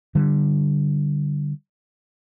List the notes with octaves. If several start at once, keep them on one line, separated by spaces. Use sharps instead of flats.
D3 G3